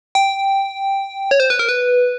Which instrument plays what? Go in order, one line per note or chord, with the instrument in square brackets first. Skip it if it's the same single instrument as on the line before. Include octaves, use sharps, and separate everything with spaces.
[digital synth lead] G5
C#5
C5
B4
A#4
B4